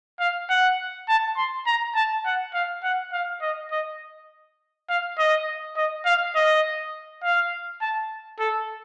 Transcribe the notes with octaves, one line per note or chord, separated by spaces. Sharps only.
F5
F#5
A5
C6
A#5
A5
F#5
F5
F#5
F5
D#5
D#5
F5
D#5
D#5
F5
D#5
F5
A5
A4